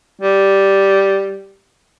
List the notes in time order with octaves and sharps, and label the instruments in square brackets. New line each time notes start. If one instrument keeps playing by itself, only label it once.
[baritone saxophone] G3